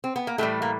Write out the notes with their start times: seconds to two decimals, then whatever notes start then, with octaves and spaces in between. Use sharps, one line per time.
0.04 C4
0.16 B3
0.27 A#3
0.38 A2 E3 G3 A3
0.62 A#3